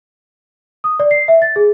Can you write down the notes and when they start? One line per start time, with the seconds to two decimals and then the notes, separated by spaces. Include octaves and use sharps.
0.84 D#6
1.00 D5
1.11 C7
1.28 E5
1.42 A6
1.56 G#4